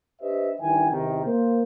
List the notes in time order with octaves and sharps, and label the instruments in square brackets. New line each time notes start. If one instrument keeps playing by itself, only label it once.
[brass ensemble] D4 G4 B4 C5 D#5 E5
G2 D#3 E3 E5 G5 G#5
E2 C3 D#3
A#3 C5